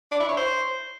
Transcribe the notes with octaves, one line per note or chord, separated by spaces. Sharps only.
D4
E4
C#5
C5